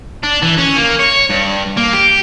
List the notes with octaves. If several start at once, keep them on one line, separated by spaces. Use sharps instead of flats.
D4
E3
C#4
A#3
C#5
G2
A#3
G4